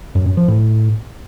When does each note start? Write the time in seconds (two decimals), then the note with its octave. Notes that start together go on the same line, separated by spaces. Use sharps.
0.15 F#2
0.26 F#2
0.37 F3
0.48 A2